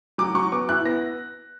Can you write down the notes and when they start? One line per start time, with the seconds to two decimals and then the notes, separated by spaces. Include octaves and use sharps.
0.18 F#3 D6
0.35 F#3 C#6
0.52 B3 D6
0.69 E4 F#6
0.85 B3 A#6